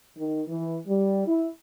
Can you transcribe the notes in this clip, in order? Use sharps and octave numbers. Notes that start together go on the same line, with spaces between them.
D#3
E3
G3
E4